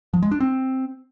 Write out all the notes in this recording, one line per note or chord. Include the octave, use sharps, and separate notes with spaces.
F3
G#3
D4
C4